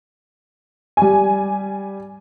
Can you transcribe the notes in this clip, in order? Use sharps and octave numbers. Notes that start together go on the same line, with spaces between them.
G3 G#5